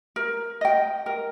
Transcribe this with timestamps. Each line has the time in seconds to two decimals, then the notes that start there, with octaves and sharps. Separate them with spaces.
0.16 A#4
0.61 D#5 G5
1.06 A#4